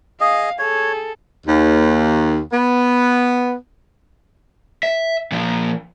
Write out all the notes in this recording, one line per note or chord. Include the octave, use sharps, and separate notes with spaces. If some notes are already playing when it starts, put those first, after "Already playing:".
G#4 D#5 F5
G#4 A4 C#5
D#2
B3
E5
A#2 F3